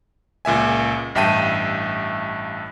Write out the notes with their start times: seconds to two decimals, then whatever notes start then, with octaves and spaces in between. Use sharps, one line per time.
0.45 C#2 A#2 E5 G#5
1.15 A1 G2 E5 G5 A5 D#7